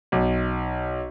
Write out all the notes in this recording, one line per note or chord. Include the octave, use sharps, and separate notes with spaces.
B1